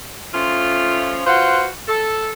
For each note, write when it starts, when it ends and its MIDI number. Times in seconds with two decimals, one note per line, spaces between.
0.33 1.21 53
0.33 1.21 57
0.33 1.21 61
0.33 1.21 65
1.26 1.68 65
1.26 1.68 66
1.26 1.68 71
1.26 1.68 72
1.88 2.32 69